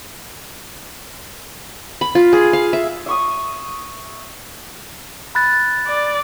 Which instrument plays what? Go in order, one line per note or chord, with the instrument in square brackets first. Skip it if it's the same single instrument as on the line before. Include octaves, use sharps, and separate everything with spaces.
[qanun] B5
F4
G#4
F5
E5
[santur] E5 C#6 D#6
[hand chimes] B5 F#6 A6
[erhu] D5